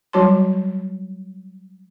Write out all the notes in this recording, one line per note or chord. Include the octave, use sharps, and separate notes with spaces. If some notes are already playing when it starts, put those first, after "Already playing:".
F#3 G3 F#4 C#5 A5 C6